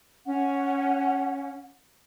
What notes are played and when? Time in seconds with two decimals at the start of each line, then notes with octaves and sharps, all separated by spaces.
0.25 C#4 F#5